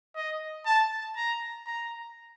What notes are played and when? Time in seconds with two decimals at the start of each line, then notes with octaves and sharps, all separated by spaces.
0.16 D#5
0.66 A5
1.16 A#5
1.66 A#5